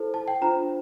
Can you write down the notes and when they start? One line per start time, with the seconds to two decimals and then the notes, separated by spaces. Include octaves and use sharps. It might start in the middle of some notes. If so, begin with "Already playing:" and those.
Already playing: E4 A4 C5
0.14 A5
0.28 G5
0.41 D4 F4 C5 A#5